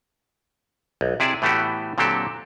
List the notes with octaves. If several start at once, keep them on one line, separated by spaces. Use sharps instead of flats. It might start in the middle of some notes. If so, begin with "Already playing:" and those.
B1
C3 E4 G#4 D5 A5
A2 E3 A3 B3 F#4 G4
A#2 D3 F#3 C4 G4 A4